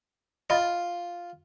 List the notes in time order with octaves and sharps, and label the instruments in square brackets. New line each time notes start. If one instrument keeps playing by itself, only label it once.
[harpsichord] F4 [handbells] D#5 B5 A6